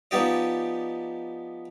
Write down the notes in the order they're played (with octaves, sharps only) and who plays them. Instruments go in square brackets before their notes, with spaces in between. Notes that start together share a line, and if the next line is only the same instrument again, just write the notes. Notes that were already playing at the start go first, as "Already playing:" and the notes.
[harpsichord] F3 B3 D#4 G4 D5 D#5